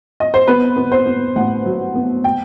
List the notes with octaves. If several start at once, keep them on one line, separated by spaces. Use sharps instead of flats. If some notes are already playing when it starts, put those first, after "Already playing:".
D#5
C5
B3 B4
B3
C5
B3
A1 F#5
F#3
B3
G5